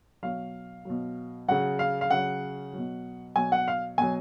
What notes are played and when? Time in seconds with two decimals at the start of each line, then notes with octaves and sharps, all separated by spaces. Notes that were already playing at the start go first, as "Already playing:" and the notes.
0.23 B2 F#3 F5
0.85 B2 F#3
1.48 C#3 F#3 F#5
1.79 F5
2.01 F5
2.10 C#3 F#3 F#5
2.73 B2 F#3
3.36 B2 F#3 G#5
3.52 F#5
3.68 F5
3.98 B2 F#3 G#5